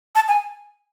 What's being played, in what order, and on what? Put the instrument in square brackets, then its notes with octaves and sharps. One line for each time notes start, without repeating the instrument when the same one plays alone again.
[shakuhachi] A5
G#5